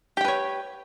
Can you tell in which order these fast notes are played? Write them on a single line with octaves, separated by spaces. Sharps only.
G4 G5 B4 C#5